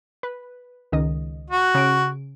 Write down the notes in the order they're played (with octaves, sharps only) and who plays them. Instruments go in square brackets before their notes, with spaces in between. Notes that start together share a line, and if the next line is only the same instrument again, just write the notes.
[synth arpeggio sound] B4
C#2 D#3 D#5
[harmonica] F#4
[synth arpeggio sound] C#3 D7